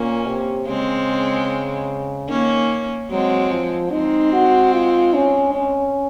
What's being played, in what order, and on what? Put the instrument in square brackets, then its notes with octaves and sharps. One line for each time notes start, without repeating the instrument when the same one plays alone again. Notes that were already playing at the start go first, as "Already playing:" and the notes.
Already playing: [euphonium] A#2 [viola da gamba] A#3 C#4
[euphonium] C3
[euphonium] C#3 [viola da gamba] G#3 C4
[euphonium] D#3 [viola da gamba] A#3 C#4
[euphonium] F#3 [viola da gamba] G#3 C4
[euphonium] F3
[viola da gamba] G#3 C4 [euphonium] D#4
[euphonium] F#4
F4
C#4
C#4